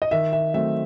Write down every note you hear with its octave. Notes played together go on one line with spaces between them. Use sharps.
D#5
D#3 E5
E5
F#3 A3 C4 E5